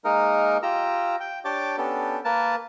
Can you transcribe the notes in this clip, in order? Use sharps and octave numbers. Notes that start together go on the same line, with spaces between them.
G#3 A#3 D#4 A#4
F4 G4 A#5 E6
G5
D4 G4 C#5 G5 A5 D6
B3 C#4 D4 G4 A4
A#3 A#4 B4 A5